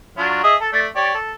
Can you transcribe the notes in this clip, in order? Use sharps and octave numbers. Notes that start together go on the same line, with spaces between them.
F#3 D4 F4
G#4 D#5 E5
A4
A3 D5
G4 C#5 D5
A4